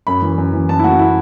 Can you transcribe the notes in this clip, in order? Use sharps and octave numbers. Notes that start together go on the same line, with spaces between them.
F#2 B5
E3
F#2
E3
F#2 A5
E4
A3 F#4
E4